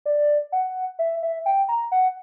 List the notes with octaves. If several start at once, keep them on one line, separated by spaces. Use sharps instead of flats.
D5
F#5
E5
E5
G5
A#5
F#5